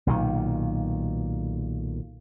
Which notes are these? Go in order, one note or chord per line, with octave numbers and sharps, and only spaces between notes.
B1 A#2 D#3